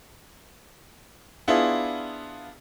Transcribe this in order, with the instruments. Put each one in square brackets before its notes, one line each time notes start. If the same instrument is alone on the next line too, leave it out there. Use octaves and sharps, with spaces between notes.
[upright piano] B3 D4 E4 F4 G#4